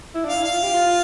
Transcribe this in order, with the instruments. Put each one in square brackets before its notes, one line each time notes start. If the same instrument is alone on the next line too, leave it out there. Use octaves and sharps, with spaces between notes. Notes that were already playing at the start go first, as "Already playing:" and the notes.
[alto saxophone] E4
[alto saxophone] D4 [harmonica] F5
[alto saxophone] E4
[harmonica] F5
[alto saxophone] F4
G4
F4